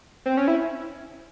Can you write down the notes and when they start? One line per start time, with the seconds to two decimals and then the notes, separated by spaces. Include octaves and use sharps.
0.26 C4
0.37 C#4
0.48 E4